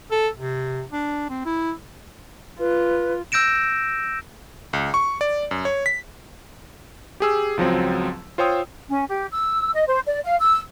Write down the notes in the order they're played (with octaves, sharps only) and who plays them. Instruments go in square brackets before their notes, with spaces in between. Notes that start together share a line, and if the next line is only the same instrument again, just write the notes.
[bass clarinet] A4
C3
D4
C4
E4
[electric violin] F4 [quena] B4
[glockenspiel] E6 G6 A#6 D7 E7
[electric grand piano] C#2
C#6
D5
F#2
C#5
B6
G4 G#4 E6
C#2 F3 F#3 C4
F4 C5 C#5 G5 D#6 E6
[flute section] C#4
G4
E6
D#5
C5
D5
F5
E6